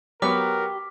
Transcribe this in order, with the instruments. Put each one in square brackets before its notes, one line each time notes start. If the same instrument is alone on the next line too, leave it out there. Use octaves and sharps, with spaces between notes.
[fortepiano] F#3 B3 C#6 [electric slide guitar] G4 [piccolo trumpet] A#4 [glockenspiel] D6 F6 B6